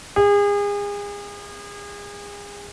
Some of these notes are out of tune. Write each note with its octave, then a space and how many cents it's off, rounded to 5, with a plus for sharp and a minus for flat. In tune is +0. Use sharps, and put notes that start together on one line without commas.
G#4 -35